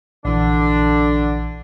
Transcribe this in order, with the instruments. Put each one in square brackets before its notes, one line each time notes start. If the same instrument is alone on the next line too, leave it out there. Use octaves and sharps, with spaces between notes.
[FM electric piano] A#1 E3 [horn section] D3 D4